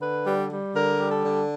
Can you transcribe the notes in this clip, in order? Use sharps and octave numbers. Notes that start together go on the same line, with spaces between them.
D3 B4
G3
G3
D3 A#4
G3
A4
D3